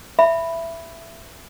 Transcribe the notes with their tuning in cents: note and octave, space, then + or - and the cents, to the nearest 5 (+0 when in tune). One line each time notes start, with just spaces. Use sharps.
E5 +15 B5 +0